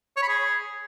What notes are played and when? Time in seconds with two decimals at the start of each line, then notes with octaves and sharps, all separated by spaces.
0.16 C#5
0.22 B5
0.28 G#4